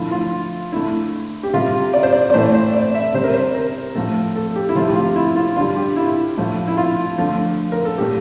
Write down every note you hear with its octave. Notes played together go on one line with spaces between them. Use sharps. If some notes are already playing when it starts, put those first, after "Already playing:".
Already playing: D3 F3 A3 E4
F4
D3 A3 E4
G4
C3 G3 F4
D5
C5
D5
D5
A2 E3 A3 C5
C5
D5
E5
C3 G3 C5
A#4
C5
A#4
A2 F3 A3 A4
A4
G4
E4
C3 F3 A3 F4
G4
F4
E4
F4
D3 G3 F4
G4
E4
A2 F3 A3
E4
F4
D3 F3 A3
A#4
A4
A#2 F3 A3 G4